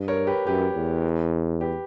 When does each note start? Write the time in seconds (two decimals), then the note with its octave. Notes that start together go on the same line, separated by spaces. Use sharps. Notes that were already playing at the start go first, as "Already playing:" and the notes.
Already playing: G2
0.08 A#4 C#5
0.27 G4 B4
0.47 F#2 G4 B4
0.75 E2
1.61 G4 B4